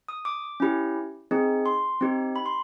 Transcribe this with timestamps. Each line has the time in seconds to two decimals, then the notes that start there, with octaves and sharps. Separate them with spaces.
0.09 D#6
0.25 D6
0.60 C#4 E4 G4
1.31 C4 D#4 G#4
1.66 C6
2.01 C4 D#4 G4
2.36 B5
2.46 C6